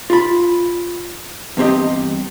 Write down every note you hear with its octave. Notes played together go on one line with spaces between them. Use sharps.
F4 B5
E2 G2 C4 G4 D#5